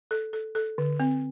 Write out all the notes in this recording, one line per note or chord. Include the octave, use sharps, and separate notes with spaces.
A4
A4
A4
D3
C4